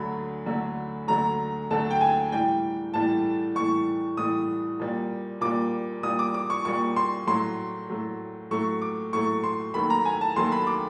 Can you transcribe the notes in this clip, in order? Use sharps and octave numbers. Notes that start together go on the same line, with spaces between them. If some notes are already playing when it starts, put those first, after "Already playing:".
Already playing: D2 D3 F#3 A3 B5
D2 D3 F#3 A3
D2 D3 F#3 A3 A#5
D2 D3 F#3 A3 A5
G5
G#5
A2 E3 G3 G5
A2 E3 G3 A5
A2 E3 G3 C#6
A2 E3 G3 D#6
A#2 G3
A#2 G3 D6
A#2 G3 D#6
D6
D6
C#6
A#2 G3 C#6
C6
A2 F#3 A3 C6
A2 F#3 A3
A2 F#3 A3 C#6
D6
A2 F#3 A3 C#6
C6
D#2 D#3 F#3 A3 B5
A#5
G#5
A5
D#2 D#3 F#3 A3 C6
B5
D6